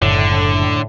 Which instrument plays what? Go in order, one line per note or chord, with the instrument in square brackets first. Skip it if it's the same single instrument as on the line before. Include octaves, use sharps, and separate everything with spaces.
[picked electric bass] F#1 [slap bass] F#2 G#3 [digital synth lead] A2 [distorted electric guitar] D3